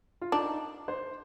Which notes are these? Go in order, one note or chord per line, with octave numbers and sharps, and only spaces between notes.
F4
D4 D#4
C5